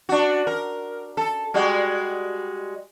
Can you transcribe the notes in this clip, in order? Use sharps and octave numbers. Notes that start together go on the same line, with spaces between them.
D4 F#4
A#4
A4
G3 G#3 F#4